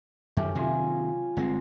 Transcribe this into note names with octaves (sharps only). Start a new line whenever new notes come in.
F#2 D#3 A3 C#4 G4
C3 D#3 F#3 F4 G#5
G1 G#3 C4